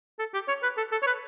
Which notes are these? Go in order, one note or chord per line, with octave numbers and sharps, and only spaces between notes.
A4
G4
C#5
B4
A4
A4
C#5
B4